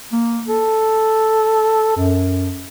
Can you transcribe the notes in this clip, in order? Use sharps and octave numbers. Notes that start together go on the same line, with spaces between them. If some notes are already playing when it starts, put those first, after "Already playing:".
A#3
A4
F#2